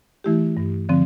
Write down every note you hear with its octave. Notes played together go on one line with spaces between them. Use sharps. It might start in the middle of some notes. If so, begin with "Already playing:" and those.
E3 A3 E4 G4
G2
D3 F3 C4